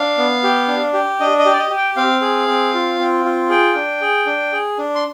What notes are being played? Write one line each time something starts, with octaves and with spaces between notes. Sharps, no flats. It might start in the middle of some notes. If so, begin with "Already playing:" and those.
Already playing: D4 F5
B3
G4
D4
G4
D4 D#5
D#5
G4
D5
D#5
G4
G5
C4 F5
G#4
C4
F4
C4
F4
G#4 G5
D4
G#4
D4
G#4
D4
C6